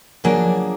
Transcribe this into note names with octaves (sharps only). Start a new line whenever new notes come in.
F3 F#3 A#3 D4 G#4